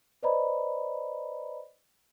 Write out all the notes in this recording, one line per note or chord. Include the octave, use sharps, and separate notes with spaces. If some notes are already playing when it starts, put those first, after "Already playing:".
B4 C5 D5 D#5 A#5 B5